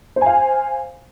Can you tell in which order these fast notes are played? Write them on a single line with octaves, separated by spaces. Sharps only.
C5 G#5 F5